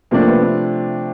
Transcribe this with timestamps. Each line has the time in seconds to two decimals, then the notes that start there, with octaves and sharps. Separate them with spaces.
0.11 C3 F3 A3 A#3 D4
0.27 B3
0.42 C4